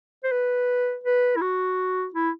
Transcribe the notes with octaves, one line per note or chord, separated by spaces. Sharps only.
C5
B4
B4
E4
F#4
E4